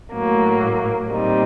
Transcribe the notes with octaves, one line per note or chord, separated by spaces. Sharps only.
A2 F#3 A#3
A#2 G3 C4 D#4